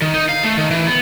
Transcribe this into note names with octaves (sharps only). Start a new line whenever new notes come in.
D#3
D#4
F5
A3
D#3
E3
B3